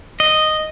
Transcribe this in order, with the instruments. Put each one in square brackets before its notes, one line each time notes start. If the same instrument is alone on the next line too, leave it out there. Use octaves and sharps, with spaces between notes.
[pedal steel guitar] D#5